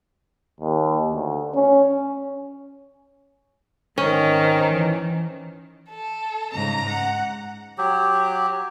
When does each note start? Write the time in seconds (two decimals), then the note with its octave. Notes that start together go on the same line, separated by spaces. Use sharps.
0.61 D#2
1.09 D2
1.55 C#4
3.98 G#1 D#3 C#4 C5
4.65 E3
5.89 A4
6.53 G#2 C#3 A#5
6.89 F#5
7.78 F#3 G4